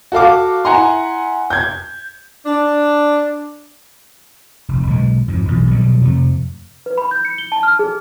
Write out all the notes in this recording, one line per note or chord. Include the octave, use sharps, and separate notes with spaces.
F#4 A4 F5 D6
E4 F#5 G#5 A#5 C6
G6 G#6
D4
F1
B1 D3 F#3 G#3
F2 G#2
B1 E2
B2 D3 F#3 G3
F2 C3 A3
B4
B5
G6
C#7
G7
A5
F6
G#4